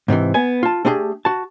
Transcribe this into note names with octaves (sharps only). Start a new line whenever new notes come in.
G#2 C3 D#3 E3
B3 G#5
F4 A5
A3 D4 D#4 G4 G#4
F#4 A5